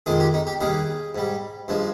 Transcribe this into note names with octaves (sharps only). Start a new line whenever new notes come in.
F2 D#3 G#3 G#4
G4
D#4
G4
D#2 D#3 G3 G#4
G#2 G3
G2 F3 G#3